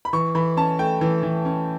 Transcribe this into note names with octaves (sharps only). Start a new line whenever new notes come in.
B5
E3 C#6
E3 B5
C#4 A5
A3 G5
E3
E3
C#4